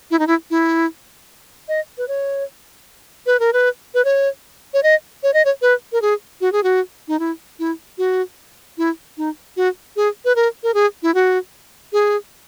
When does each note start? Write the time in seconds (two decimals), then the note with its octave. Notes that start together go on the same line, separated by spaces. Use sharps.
0.11 E4
0.19 D#4
0.27 E4
0.50 E4
1.68 D#5
1.98 B4
2.08 C#5
3.26 B4
3.40 A#4
3.53 B4
3.94 B4
4.05 C#5
4.74 C#5
4.83 D#5
5.23 C#5
5.34 D#5
5.45 C#5
5.62 B4
5.92 A#4
6.02 G#4
6.41 F#4
6.52 G#4
6.63 F#4
7.08 D#4
7.19 E4
7.59 E4
7.98 F#4
8.78 E4
9.17 D#4
9.57 F#4
9.96 G#4
10.25 B4
10.36 A#4
10.63 A#4
10.74 G#4
11.03 E4
11.14 F#4
11.93 G#4